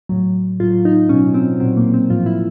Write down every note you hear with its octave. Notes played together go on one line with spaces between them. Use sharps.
A2 F#3
A2 F#3 F4
D#4
B2 F#3 C#4
C4
A#2 F#3 C4
A#3
C4
A2 F3 F4
E4